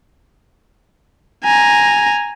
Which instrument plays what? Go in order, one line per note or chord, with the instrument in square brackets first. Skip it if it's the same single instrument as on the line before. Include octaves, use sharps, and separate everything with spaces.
[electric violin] G#5 A#5